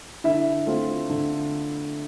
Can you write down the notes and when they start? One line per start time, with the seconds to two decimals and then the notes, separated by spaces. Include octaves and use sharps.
0.24 D3 E4 E5
0.66 A3 C4 F4
1.10 D3